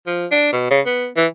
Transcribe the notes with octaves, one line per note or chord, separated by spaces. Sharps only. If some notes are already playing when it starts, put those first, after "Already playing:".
F3
D4
B2
C#3
B3
E3